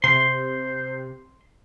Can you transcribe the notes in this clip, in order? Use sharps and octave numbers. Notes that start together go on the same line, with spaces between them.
C3 C5 C6